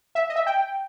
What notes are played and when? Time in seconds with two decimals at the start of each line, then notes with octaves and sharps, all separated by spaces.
0.15 E5
0.30 D#5
0.36 E5
0.47 G5